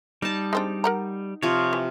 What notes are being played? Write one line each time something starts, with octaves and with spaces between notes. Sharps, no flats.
G3 D#4 A5
G#3 C4 D4
A#4 F#5 A#5
C3 F3 C#5
E3